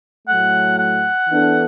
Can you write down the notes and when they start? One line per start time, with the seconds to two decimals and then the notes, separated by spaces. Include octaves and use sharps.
0.28 A2 F#3 A3 F#5
0.78 F#5
1.29 E3 B3 D4 A4